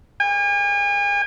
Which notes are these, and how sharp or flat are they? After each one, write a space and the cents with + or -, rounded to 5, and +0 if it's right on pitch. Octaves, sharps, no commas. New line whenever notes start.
G#5 -40